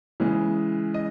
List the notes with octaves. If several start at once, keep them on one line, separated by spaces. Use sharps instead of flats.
C#3 E3 G#3
D#5